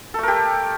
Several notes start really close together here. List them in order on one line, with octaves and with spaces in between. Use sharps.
A4 A3 A#4 G4